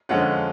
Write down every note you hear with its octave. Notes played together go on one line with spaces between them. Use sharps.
F2 D3 G#3 C#4 F4 F#5